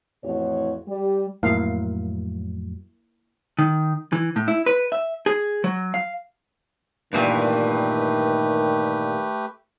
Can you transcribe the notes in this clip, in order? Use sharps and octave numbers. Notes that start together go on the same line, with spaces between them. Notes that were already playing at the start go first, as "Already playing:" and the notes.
F2 A2 E3 F#4 C#5
G3
F2 A2 F#3 A#3 E4 F5
D#3
E3
A2
E4
B4
E5
G#4
F#3
F5
G2 A#2 D#3 E3 A3 G4 B4